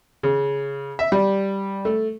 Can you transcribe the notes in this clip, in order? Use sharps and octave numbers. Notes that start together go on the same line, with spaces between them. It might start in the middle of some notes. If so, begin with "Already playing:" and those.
C#3
E5
G3
A3